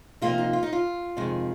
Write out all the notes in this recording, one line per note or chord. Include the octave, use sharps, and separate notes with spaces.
C3 F3 A#3 D#4 F4
D#4
F4
D#4
F4
F2 C3 D#3 G#3